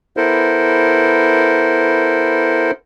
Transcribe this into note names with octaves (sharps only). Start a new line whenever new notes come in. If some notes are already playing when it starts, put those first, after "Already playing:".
B3 E4 A4 A#4 C5